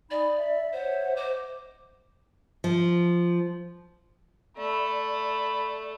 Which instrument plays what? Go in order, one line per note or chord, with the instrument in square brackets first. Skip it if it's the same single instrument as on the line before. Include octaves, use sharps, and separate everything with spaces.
[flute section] D#4 G#5 B5 [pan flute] D5
[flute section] E5
[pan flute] C5 [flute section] C#5 E5 F#5
[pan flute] C5 [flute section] D#5 D6
[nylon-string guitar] F3
[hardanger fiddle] A3 [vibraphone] D5 [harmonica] B5